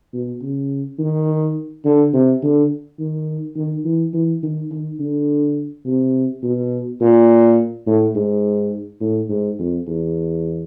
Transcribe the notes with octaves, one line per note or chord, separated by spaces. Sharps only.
B2
C#3
D#3
D3
C3
D3
D#3
D#3
E3
E3
D#3
D#3
D3
C3
B2
A#2
A2
G#2
A2
G#2
F2
E2